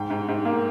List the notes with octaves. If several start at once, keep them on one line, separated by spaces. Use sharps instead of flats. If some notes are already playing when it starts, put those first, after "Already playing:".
Already playing: G#2 G5
G#2
G#2
A#3